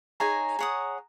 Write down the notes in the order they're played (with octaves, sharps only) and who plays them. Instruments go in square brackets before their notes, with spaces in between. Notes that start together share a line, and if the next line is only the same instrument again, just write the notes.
[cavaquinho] D#4 G#4 C#5 G#5 [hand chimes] A#5
[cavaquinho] G#4 C#5 F#5 D#6